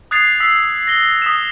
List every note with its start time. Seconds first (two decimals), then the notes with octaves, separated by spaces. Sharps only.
0.11 D#6 F#6 G#6 A6 C7 F7
0.40 E6 B6 C7
0.87 A#6 F#7 G7
1.22 D#6 B6 E7